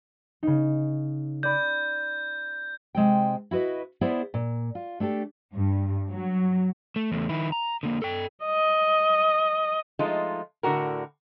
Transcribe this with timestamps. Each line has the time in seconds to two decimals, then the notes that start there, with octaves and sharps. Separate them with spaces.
0.43 C#3 D#4
1.43 D5 B5 G6
2.95 C3 G#3 C4 G5
3.51 E4 F#4 B4 D#5
4.01 B3 E4 G#4 C5 D5
4.34 A#2
4.75 F4
5.00 A3 D4 G4 A4
5.55 G2
6.11 F#3
6.96 A3
7.12 E2 A3
7.29 D#3 E4
7.52 A#5
7.83 D3 A#3
8.02 A4 G5
8.45 D#5
9.99 F3 G#3 A3 D#4 F4
10.63 A2 D3 E3 F#4 A#4